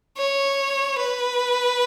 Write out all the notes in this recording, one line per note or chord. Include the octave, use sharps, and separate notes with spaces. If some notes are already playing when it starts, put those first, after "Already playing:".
C#5
B4